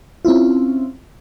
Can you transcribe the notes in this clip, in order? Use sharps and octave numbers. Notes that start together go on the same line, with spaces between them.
C4 C#4 E4 F4